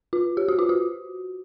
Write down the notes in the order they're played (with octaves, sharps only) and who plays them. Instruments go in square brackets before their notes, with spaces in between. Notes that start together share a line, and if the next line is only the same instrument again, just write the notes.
[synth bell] F4
G4
F#4
F4
F#4